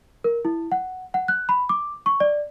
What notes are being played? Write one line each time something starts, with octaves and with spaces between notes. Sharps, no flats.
A#4
E4
F#5
F#5
F#6
B5
D6
C#6
D5